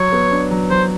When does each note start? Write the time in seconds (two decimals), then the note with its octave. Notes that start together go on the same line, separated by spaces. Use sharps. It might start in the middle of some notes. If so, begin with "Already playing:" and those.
Already playing: F#3 C#5
0.12 B3
0.31 D4
0.51 F#3
0.70 F#3 C5